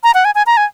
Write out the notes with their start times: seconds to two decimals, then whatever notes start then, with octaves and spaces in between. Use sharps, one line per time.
0.04 A#5
0.14 F#5
0.25 G#5
0.35 G#5
0.47 A#5
0.57 G#5